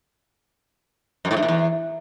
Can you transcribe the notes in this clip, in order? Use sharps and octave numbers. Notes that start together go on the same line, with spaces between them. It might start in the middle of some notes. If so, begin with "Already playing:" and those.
F#2
A2
G2
A#2
E2